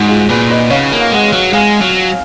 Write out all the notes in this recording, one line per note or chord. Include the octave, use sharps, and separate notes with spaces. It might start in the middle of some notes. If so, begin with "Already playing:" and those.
Already playing: G#2 D#4 F#4
F4 G#4
A#2 G#4 B4
B4 D#5
C#3 C#5 F5
A#3
F5
G#3 D#5 F#5
F#3
G#3 F5 G#5
F#3